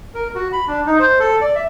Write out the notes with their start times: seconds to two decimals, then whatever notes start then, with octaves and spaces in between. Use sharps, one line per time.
0.15 A#4
0.35 F#4
0.53 B5
0.67 D4
0.86 D#4
0.99 C5
1.19 A4
1.41 D5
1.55 E5